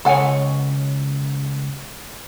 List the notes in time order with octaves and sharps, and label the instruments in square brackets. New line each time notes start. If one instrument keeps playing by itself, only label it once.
[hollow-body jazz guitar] C#2 C#5 [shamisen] A4 F#5 G#5